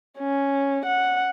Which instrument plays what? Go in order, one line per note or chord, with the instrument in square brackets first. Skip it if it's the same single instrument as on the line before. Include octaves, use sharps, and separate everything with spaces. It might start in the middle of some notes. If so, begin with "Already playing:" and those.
[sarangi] C#4
F#5